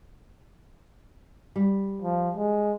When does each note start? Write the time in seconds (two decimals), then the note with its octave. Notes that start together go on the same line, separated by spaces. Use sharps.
1.56 G3
2.02 F3
2.36 G#3